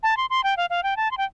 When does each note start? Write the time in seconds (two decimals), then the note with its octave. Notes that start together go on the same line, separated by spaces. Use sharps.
0.03 A5
0.17 C6
0.30 C6
0.44 G5
0.57 F5
0.70 F5
0.83 G5
0.97 A5
1.11 C6
1.18 G5